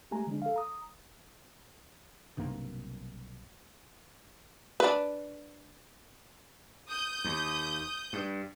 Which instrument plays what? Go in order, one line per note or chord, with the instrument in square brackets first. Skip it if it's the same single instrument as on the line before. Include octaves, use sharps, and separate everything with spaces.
[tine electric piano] G#3 A3 G4 G#5 A#5
D3 F3 G#3 D4
A4 F5
A#5 D#6
[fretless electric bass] B1 G2 C3 A#3
[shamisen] D4 B4
[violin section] D#6 G6
[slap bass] D#2
G2